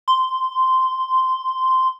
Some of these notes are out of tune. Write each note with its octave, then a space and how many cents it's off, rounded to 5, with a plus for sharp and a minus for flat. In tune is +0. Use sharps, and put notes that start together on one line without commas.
C6 -10